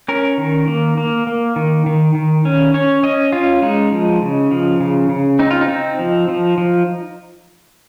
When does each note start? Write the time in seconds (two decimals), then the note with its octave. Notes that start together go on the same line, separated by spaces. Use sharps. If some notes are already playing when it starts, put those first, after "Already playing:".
0.08 C#4 A#4
0.38 D#3
0.68 A#3
0.97 A#3
1.27 A#3
1.56 D#3
1.86 D#3
2.15 D#3
2.45 C#4
2.74 C#4 C#5
3.03 C#4 D#5
3.32 C#4 F4
3.62 G#3 D#4
3.92 F3
4.22 C#3
4.51 F3
4.80 C#3
5.09 C#3
5.39 C4 D#4
5.51 F4
5.61 D#4
5.68 C4
5.99 F3
6.29 F3
6.58 F3